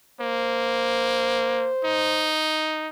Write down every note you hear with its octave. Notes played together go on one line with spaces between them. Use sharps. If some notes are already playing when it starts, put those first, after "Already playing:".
A#3 C5
D#4